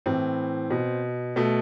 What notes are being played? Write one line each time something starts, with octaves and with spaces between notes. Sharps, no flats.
A2 E3 C4
B2
B2 A3